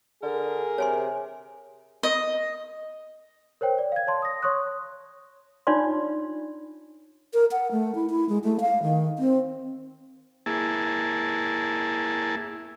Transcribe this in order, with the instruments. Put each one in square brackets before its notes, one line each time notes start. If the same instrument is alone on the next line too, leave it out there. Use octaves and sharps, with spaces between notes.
[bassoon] D3 [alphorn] G#4 [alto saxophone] A#4
[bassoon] C3 [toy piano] C#5 G#5 C6
[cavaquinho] D#5
[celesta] A#4 C5 C#5 G5
D5
F5 G#6
C#5 A5 C6
D#6 A#6
C#5 C6 C#6 D#6 F#6
[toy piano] D4 D#4 F4 C#5 D5 C6
[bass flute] A#4
F#5
A3
E4
E4
G#3
A3
F5
D#3
C4
[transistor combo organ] A#3 E4 G#4 A5